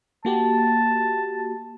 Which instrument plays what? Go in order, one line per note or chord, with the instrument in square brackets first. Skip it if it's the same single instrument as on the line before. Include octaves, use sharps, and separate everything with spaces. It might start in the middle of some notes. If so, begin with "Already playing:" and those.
[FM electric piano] A#3 F#4 G4 [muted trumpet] A5